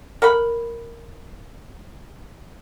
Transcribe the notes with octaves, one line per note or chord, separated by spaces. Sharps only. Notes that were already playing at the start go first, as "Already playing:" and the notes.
A#4 F#5 B5